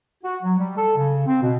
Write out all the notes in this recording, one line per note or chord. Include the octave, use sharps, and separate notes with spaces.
F#4
F#3
G3
A4
C#3
C4
B2